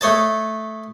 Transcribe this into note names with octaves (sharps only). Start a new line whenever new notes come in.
A3 C#5 D#5 A5